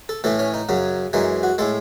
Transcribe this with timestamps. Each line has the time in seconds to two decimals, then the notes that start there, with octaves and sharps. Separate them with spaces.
0.09 A4
0.24 A2 E3 A3 A4
0.39 C#4
0.54 D#4
0.69 F#2 C#3 F#3
1.13 F#2 E3 G#3 D#4
1.43 F#4
1.58 A2 G#3 A4